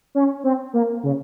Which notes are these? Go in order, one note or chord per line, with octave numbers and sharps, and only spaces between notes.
C#4
C4
A#3
C#3